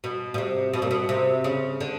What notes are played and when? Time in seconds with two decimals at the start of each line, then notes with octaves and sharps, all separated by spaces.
0.04 B2
0.34 B2
0.38 C3
0.73 B2
0.82 A#2
0.91 B2
1.09 C3
1.44 C#3
1.81 D3